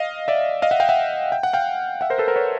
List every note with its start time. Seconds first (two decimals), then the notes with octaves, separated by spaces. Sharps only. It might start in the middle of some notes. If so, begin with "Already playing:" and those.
Already playing: D#5 F5
0.28 D5 E5
0.62 D#5 F5
0.71 E5 F#5
0.80 F5 G5
0.89 E5 F#5
1.32 G5
1.43 F#5
1.53 F5 G5
2.01 E5 F#5
2.10 A#4 C5
2.18 A4 B4
2.28 A#4 C5
2.36 B4 C#5